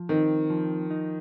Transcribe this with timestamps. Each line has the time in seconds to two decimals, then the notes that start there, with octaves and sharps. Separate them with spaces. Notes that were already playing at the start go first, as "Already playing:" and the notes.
Already playing: F3
0.09 D#3 C4
0.50 F3
0.90 D#4